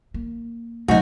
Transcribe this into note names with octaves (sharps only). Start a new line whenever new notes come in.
A#3
D2 C3 F#3 D#4 F#4